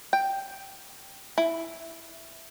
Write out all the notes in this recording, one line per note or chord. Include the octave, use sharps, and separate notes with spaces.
G5
E4